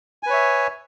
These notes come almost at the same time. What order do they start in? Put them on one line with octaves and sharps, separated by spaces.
G#5 B4 C#5 E5